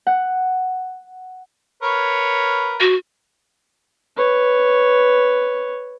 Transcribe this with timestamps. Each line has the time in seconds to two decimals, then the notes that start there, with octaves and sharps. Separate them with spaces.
0.07 F#5
1.83 A#4 B4 C#5
2.80 F#4
4.16 B4 C#5